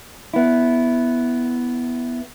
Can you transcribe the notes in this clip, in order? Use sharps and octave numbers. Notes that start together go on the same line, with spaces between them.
B3 E4